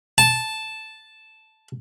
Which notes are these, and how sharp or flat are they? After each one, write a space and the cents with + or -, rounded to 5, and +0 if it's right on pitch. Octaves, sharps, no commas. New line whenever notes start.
A5 -5